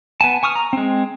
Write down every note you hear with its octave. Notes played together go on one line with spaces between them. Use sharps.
B3 G#5 A5
G#5 C#6 D#6 F6
A#5
G#3 C4